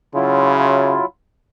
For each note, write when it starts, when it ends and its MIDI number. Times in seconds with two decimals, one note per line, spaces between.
0.15 0.99 49
0.15 1.05 54
0.15 1.05 64
0.15 1.05 65